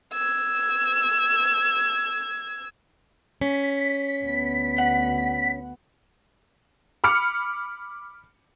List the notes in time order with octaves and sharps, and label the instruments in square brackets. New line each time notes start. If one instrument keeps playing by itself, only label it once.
[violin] E6 G#6
[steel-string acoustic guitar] C#4 [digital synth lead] B6
[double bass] D2 B3
[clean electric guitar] F#5
[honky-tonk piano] B5 D6 F6 C#7